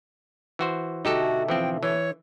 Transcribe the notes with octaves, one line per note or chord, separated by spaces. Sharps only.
E3 F#4 C5
B2 D3 A3 D#4 F#4 G4 A4
E3 F3 C4 G5
E3 C#5